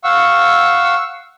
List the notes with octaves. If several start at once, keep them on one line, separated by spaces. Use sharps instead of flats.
F5 F#5 C#6 E6